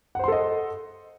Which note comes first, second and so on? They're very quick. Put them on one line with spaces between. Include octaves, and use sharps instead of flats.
F#5 C5 C6 A4 D#5